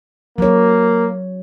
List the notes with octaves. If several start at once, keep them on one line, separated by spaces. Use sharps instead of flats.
F#3 A#3 C#5